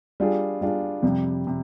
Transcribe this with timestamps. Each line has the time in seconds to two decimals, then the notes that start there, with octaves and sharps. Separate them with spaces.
0.20 G3 D4 F4 G#4
0.61 G3 D4 F4 G#4
1.03 F2 C3 G3
1.47 C3